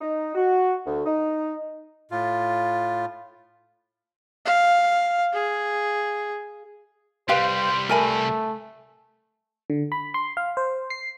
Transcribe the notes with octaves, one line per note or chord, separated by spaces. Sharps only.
D#4
F#4
D2
D#4
A2 F4
F5
G#4
C2 G3 G4 B4 C5 F5
A3 A#4 G#5 B5
D3
B5
C6
F5
C5
C7